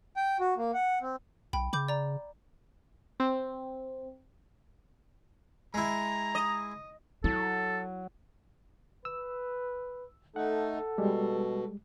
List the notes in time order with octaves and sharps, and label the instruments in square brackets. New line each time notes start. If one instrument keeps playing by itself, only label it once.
[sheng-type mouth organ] G5
F#4
A#3
F#5
C4
[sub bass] B1 [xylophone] G5 B5
[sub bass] C#3 [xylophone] B5 D6 G6
[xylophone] D5 A#5
[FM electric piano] C4
[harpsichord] G#3 E4 [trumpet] A#5
[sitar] D#5
[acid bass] F#3 [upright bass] E4 [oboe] A4
[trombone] B4 [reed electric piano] E6
[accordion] A3 D#4 [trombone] A4 [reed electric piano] F#5
[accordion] B2 [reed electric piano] G3 G#3